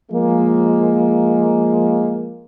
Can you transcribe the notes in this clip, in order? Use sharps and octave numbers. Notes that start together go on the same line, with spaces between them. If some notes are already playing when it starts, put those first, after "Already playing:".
F3 G#3 A#3